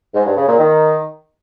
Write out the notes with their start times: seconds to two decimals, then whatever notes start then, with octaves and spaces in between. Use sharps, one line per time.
0.14 G#2
0.25 G2
0.36 C#3
0.47 A#2
0.58 D#3